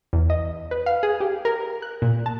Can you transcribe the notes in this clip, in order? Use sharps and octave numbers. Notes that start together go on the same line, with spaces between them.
E2
D#5
B4
F5
G#4
G4
A#4
F#6
A#2
A5